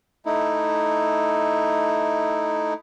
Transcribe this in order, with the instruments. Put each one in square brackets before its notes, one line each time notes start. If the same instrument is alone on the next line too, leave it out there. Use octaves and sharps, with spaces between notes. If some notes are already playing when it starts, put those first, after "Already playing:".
[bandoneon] A3 D#4 E4